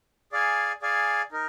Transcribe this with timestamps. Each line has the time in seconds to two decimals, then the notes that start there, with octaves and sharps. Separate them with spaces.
0.32 G#4 D5 F5 G#5
0.82 G#4 D5 F5 G#5
1.32 D#4 A#4